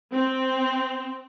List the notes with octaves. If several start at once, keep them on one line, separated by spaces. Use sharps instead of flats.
C4